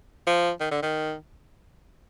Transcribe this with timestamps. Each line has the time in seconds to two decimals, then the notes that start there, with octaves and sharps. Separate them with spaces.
0.27 F3
0.60 D#3
0.71 D3
0.83 D#3